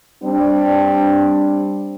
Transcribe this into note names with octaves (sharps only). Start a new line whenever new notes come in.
G3 C4 D4